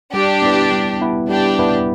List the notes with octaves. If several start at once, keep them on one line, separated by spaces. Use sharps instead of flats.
G3 D4 G4
B3 E4 B4
G3
B3 E4 B4
G3 D4 G4
B3 E4 B4